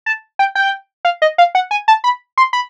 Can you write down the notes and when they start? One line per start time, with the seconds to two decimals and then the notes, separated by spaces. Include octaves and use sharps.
0.06 A5
0.39 G5
0.55 G5
1.05 F5
1.22 D#5
1.38 F5
1.55 F#5
1.71 G#5
1.88 A5
2.04 B5
2.38 C6
2.53 B5